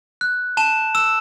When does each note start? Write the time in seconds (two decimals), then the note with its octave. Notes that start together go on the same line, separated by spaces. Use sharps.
0.21 F#6
0.57 A5 E7
0.95 E6 E7